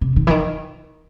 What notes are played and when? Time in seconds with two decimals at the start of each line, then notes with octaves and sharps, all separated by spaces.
0.01 C3
0.16 D#3
0.27 E3
0.30 D#3